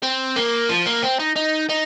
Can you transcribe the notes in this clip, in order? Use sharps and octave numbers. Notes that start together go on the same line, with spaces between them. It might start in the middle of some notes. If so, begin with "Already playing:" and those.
C4
A#3
F3
A#3
C4
D#4
D#4
D#4